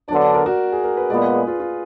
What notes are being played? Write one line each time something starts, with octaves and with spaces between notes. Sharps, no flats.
D3 F#3 B3 D4 D5
D5
A#4
F#4
G#4
A#4
B4
A#2 G#3 B3 D5
B4
G#4
F4
F4